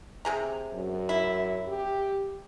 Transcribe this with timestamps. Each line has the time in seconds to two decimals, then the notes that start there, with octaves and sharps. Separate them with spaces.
0.25 C3 G#4 A#5
0.74 F#2
1.09 E4
1.68 G4